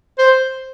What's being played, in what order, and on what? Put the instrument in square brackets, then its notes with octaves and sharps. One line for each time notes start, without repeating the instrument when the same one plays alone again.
[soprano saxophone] C5